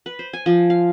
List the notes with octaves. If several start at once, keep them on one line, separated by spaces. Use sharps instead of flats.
B4
C5
G#5
F3
F5